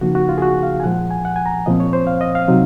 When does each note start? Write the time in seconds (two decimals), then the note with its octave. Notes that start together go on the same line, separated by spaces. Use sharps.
0.01 C#3 F3 A#3 D#4 F#4
0.15 F#4
0.29 F4
0.38 G#4
0.42 F#4
0.63 F5
0.80 G#5
0.84 A#2 F3 G#3 F#5
1.11 G#5
1.25 F#5
1.36 G#5
1.46 A#5
1.66 A#2 F3 C4 D#5
1.80 C#5
1.93 C5
2.07 F5
2.21 D#5
2.35 F5
2.48 C3 F#3 C4 D#4